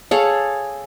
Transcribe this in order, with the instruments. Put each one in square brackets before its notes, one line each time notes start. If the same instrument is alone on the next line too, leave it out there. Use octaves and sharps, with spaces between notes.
[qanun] G#4 A4 C#5 F5